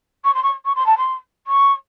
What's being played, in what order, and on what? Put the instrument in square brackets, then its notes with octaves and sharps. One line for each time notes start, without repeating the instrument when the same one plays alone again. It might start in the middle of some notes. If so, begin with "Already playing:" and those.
[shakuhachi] C#6
C6
C#6
C#6
C6
A5
C6
C#6